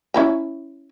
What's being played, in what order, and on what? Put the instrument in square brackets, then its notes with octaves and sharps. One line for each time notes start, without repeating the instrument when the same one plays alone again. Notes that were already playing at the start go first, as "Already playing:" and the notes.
[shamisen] C#4 E4 A#5